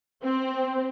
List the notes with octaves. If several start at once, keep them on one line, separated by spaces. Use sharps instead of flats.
C4